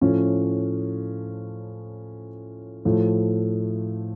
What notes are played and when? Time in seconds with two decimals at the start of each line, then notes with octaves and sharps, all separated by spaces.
0.01 A2 F3 A3 C#4
2.85 A2 F3 A3